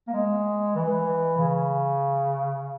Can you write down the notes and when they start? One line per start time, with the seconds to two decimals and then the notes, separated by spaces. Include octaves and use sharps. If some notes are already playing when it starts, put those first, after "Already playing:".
0.08 A#3
0.13 G#3
0.75 E3
1.38 C#3